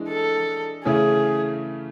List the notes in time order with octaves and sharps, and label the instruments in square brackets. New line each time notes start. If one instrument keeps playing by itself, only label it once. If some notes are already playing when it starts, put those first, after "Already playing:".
Already playing: [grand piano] E3 G#3 D4
[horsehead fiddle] A4
[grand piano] C#3 E3 A3 C#4 E4 [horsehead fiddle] G#4